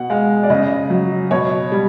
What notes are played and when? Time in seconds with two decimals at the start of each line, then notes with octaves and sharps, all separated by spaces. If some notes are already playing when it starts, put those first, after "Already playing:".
Already playing: B2 F#5
0.10 G#3 F5
0.43 D5
0.50 C#3 D#5
0.90 F#3
1.31 B2 C#5
1.72 G3